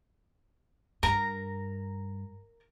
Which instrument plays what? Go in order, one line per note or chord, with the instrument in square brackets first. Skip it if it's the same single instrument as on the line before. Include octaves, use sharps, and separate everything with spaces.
[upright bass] G2 [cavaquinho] A#4 A#5